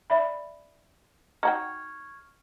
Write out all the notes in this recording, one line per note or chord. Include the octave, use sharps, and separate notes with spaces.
D5 E5 B5
D#4 F#4 G5 C#6 F6 G#6